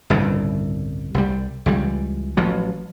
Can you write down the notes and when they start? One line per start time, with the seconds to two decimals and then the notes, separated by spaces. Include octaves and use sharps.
0.10 G1 C2 A2 C#3
1.14 C2 G3
1.66 C#2 E3 G3
2.37 A1 F3 F#3